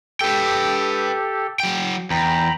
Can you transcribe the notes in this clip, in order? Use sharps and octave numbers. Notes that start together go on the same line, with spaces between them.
G4 A4 B4 G5
F#3 G5
E2 G5 A#5 B5